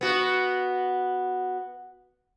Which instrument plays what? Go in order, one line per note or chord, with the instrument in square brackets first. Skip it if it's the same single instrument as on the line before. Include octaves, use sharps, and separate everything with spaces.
[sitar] B3 F#4